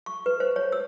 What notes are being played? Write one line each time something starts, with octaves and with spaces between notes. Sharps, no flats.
C#6
B4
C5
C#5
E6